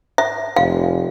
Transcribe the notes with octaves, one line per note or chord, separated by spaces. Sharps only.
E5
F1 F5